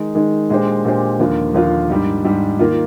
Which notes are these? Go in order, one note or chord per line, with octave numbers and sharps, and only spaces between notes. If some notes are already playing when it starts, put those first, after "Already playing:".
Already playing: D#3 G#3 D#4
D#3 G#3 D#4
A#2 G#3 D4 G4 C5
A#2 G#3 D4 G4 C5
D#2 D3 F3 A#3 F4
D#2 D3 F3 A#3 F4
G#2 G3 D4
G#2 G3 D4
D#3 A#3 F4